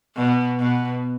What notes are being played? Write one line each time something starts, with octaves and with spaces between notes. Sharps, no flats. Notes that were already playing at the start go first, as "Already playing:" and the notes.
B2
B2